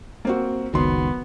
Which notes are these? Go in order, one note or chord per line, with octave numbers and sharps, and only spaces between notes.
A#3 C4 F#4
F#1 C#2 D#3 F#3 B3 C6